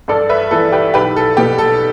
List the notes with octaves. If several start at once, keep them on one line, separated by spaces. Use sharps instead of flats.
G2 A4 D5
B4 E5
E3 B3 E4 A4
G4 B4
B1 G4 B4
A4
B2 B3 G4
A4